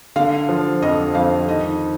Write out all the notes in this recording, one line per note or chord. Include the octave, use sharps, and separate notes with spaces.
D3 F5
F3
F2 D#5
F2 F5
D#3 D#5